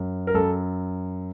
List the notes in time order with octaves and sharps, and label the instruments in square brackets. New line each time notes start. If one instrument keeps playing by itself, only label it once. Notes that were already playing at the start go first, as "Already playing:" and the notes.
Already playing: [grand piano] F#2
A#4
F#2 A4